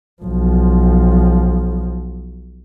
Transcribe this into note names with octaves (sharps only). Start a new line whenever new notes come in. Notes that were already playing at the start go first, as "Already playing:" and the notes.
B1 F3